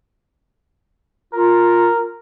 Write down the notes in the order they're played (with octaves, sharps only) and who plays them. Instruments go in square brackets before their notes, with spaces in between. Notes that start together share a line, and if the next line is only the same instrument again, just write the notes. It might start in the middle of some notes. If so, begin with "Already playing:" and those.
[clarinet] F4 [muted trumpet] A#4